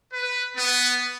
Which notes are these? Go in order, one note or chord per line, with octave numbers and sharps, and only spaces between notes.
B4
B3